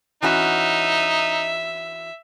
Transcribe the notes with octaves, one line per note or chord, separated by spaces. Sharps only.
E3 C#4 D#4 F#4 E5